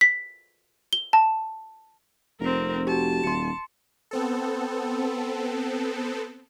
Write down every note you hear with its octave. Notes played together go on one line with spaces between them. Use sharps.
B6
G7
A5
F1 C4 A#4
F#4 G4 A5
D#1 C6 C#7
B3 C4 A4